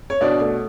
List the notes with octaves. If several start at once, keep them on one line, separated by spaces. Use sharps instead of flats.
C#5
B2 D4 D5
A3